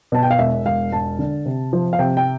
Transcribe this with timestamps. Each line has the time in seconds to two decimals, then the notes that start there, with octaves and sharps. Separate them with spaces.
0.12 B2 A5
0.23 G5
0.31 F5
0.38 E1 E5
0.65 E1 F5
0.92 E1 A5
1.19 D3
1.46 C3
1.73 F3
1.93 F5
1.99 C3 G5
2.17 G5